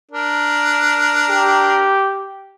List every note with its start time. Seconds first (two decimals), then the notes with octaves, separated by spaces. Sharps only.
0.11 D4 A#4
1.29 G4